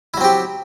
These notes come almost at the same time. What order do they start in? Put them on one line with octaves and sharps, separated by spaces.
E4 F#3 C4 G4